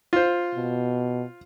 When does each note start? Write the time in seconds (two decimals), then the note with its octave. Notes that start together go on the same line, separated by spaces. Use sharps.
0.13 F4 C5
0.55 B2